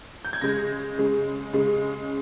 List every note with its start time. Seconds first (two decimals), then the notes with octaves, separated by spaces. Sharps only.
0.25 G6
0.33 G#6
0.41 C#3 G#3 A#6
0.98 C#3 G#3
1.53 C#3 G#3